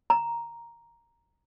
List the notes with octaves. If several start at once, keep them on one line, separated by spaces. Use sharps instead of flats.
A#5